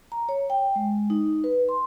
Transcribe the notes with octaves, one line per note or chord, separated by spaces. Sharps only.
A#5
C#5
G5
G#3
D#4
B4
C6